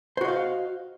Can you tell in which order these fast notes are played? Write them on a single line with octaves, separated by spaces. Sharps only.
C5 F#4 D#5 F5